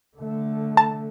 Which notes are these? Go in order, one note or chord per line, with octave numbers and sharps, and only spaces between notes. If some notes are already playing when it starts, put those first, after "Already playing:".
D3 A3
A5